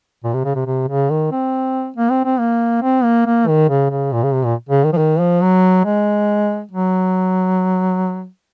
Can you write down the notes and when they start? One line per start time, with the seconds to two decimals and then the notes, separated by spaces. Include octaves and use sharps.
0.24 A#2
0.34 C3
0.45 C#3
0.55 C3
0.66 C3
0.88 C#3
1.10 D#3
1.31 C4
1.97 A#3
2.11 C4
2.25 C4
2.39 A#3
2.83 C4
3.04 A#3
3.26 A#3
3.48 D#3
3.69 C#3
3.90 C#3
4.12 A#2
4.23 C#3
4.33 C3
4.45 A#2
4.69 C#3
4.84 D#3
4.93 F3
4.97 D#3
5.20 F3
5.42 F#3
5.85 G#3
6.71 F#3